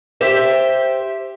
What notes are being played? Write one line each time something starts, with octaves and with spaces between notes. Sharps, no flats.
G4 C5 E5